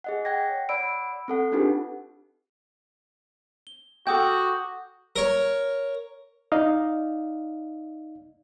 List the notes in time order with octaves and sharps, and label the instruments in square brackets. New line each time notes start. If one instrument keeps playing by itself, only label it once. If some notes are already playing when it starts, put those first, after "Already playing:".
[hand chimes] G#4 D#5 F#5
F#5 G5 G#6 A#6
C#5
D5 F#5 B5 E6 D7
C4 A4 F#5
D4 D#4 F4 G4 G#4 B4
[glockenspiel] G7
[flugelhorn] F#4 [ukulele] A4 G5 [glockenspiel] D6 D#6 G6
[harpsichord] A#4 C#5
[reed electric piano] D#4 D5 D#5 F5